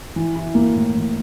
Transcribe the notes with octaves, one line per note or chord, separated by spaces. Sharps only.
E3
E4
A#3
A2
E3